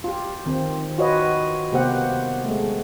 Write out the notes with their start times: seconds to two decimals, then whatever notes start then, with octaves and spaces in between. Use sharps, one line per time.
0.04 F4 G4
0.46 D#3 C4
0.98 F4 F#4 B4 C#5 D#5
1.72 C3 A#3 B3 G4 C5 F#5
2.45 G#3 A3